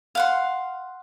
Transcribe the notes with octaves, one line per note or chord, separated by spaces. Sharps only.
F5 F#5 C6